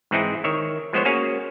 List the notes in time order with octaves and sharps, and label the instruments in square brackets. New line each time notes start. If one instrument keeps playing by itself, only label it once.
[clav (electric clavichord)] G#2 E3 C4 D#4 E4 G#4
D#3 C#5 E5
F3 G#3 B3 C5 C#5
A#3 C#4 F#4 G#4 C#5 F5